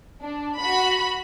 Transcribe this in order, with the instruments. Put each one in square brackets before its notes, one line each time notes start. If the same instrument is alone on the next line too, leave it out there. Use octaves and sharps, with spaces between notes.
[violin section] D4
F#4 B5